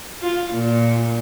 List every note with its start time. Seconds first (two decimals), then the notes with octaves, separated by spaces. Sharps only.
0.22 F4
0.54 A#2